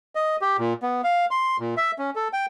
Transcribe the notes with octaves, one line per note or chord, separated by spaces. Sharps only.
D#5
G4
A#2
B3
F5
C6
A#2
E5
C#4
A4
G5